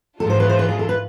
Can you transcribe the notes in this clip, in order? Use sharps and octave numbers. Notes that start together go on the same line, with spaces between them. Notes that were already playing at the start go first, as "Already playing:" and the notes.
G#2 E3 G#3 D4 F4 A4
C5
B4
C5
B4
G#4
A4
B4